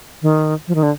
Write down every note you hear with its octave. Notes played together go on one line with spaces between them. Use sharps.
D#3
F3
D#3
D3